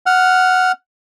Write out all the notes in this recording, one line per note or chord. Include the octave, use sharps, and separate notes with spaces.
F#5 F6